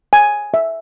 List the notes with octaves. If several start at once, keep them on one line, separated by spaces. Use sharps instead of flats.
G#5
E5